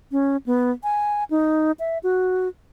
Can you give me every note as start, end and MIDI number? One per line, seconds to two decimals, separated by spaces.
0.12 0.37 61
0.46 0.71 59
0.83 1.24 80
1.30 1.72 63
1.79 1.98 76
2.03 2.48 66